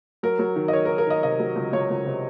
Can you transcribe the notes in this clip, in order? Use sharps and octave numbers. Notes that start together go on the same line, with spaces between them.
F#3 A#4
F#3
D#3
D#5
D#3 C#5
A#4
D#3
A#4
D#3 D#5
C3 D#5
F#3
C#2
C#2 C#5
C#2
C3